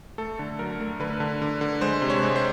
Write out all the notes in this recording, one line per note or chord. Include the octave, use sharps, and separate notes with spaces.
A3 A4
D3
F#3 A#4
A3
D3 B4
D3
D3
D3
G#3 C5
C3
C#5
G#3
C5